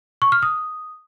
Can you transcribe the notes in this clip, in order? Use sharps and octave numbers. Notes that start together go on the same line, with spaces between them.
C#6
F6
D#6